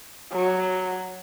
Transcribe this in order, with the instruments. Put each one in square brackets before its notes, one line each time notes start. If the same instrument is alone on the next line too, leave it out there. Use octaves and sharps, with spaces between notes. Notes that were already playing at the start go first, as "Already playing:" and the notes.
[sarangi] F#3